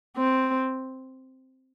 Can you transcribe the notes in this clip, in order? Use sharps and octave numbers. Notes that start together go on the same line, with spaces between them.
C4